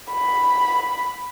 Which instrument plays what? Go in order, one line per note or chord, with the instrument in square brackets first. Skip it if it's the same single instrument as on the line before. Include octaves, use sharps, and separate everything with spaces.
[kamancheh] B5